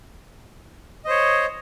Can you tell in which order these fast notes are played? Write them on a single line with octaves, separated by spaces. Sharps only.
D#5 C5 C#5